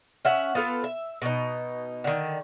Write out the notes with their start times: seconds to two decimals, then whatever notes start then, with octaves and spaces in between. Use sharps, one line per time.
0.25 C#4 E5 F#5
0.55 B3 F4 A4 B4
0.84 E5
1.22 B2 D#4
2.04 D3 D#3